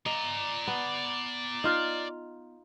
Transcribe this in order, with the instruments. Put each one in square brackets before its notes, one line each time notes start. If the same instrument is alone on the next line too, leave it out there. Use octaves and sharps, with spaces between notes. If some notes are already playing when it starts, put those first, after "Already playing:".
[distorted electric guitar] D5 A#5 [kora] D#5
[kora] B3
D#4 F4 F5